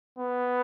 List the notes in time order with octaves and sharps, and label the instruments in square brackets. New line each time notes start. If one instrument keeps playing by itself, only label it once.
[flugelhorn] B3